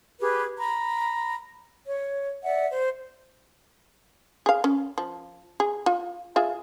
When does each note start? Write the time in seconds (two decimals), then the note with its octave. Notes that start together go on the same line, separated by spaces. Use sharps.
0.21 G4 G#4 B4
0.59 A#5 B5
1.87 C#5
2.44 D5 E5 F#5
2.70 C5
4.46 G#4 F5
4.64 C#4
4.98 F3
5.60 G#4
5.86 F4
6.36 F4 G#4 E5